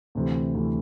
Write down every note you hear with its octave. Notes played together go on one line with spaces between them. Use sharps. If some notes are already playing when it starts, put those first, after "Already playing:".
D2 C3 E3
D2 C3 E3